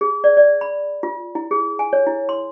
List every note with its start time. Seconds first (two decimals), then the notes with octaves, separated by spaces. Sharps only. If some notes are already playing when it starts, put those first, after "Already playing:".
0.01 G#4
0.24 D5
0.37 D5
0.61 B5
1.03 F4
1.35 E4
1.51 G#4
1.79 G#5
1.93 C#5
2.07 E4
2.29 C6